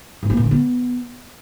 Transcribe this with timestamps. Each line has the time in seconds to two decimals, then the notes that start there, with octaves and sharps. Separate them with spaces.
0.23 G#2
0.30 A#3
0.37 A#2
0.44 D3
0.51 B3